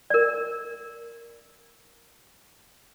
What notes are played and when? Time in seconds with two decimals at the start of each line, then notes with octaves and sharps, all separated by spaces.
0.10 A#4 D5